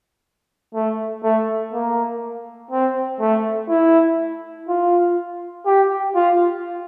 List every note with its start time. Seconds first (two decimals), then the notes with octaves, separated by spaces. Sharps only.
0.74 A3
1.23 A3
1.73 A#3
2.71 C4
3.20 A3
3.69 E4
4.68 F4
5.66 G4
6.15 F4